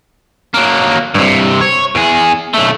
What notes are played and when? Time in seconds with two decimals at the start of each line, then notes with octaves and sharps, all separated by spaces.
0.54 F#3 A#3
1.14 G2 C3
1.61 C#5
1.95 E2 G#4
2.54 B1 A3